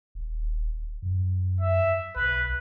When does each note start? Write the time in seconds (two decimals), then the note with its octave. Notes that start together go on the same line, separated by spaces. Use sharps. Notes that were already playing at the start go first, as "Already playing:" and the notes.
0.15 D#1
1.02 F#2
1.61 E5
2.16 B1 B4